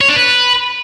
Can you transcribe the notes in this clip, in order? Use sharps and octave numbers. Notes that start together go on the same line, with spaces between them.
C#5
D4
B4